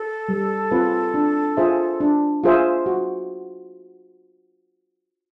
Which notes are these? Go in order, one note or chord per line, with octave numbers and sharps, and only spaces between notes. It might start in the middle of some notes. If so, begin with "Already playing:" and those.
Already playing: A4
G3
C4 F4 G#4 B4
D4
F4 G#4 C5 E5
D4
F4 G#4 C5 E5
F#4